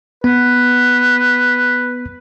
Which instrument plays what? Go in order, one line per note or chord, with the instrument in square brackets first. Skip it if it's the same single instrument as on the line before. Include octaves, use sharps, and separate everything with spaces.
[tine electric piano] B3 [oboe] B4